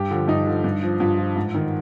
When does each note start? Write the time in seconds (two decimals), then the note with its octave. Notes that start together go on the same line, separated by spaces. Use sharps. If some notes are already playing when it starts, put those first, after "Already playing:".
Already playing: G2 G4
0.11 D3 F3
0.28 G2 D#4
0.47 D3 F3
0.64 G2
0.82 F3
1.00 G2 F4
1.18 F3
1.36 G#2
1.54 D#3